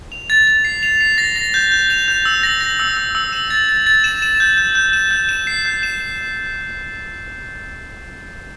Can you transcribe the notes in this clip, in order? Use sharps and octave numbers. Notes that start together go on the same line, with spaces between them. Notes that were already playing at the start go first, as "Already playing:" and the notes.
F7
A6
A6
C7
F7
C7
A#6
A#6
G6
G6
F7
G6
E6
A#6
A#6
E6
E6
E6
E7
A6
A6
A6
E7
E7
G6
G6
G6
E7
G6
E7
C7
G6
E7